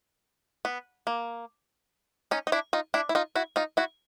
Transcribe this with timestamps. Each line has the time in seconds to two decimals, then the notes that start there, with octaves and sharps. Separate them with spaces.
0.65 B3
1.07 A#3
2.31 C#4 D#4
2.47 D#4
2.52 D4 E4
2.73 D#4 F4
2.94 D4 E4
3.09 E4
3.15 D#4 F4
3.35 E4 F#4
3.56 D#4 F4
3.77 E4 F#4